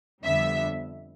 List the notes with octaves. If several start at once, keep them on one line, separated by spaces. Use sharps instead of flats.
F2 D3 G3 B3 E5